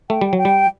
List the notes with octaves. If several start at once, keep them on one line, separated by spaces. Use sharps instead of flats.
A3 G5
G3
F#3 G5
G3